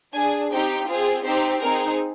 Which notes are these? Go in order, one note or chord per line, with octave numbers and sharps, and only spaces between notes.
D4 G#4 G#5
C4 D#4 G4 G5
C4 F4 G#4
C4 D#4 G4 C5
C4 D#4 G#4 A#4